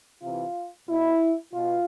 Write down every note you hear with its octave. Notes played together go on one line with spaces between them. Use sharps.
C3 E3 F4
B2 E4
B2 F4